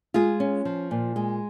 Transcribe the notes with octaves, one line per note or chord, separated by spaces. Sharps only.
G#3 F4 G#4
C#4
F3
A#2
G#3